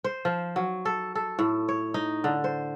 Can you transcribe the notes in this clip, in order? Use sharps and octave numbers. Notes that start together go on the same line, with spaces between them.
C5
F3
F#3
A4
A4
A2
C#5
D#4
D3
C5